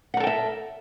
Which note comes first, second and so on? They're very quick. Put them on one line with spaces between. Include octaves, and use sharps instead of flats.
F#5 A#4 A4 G5 E5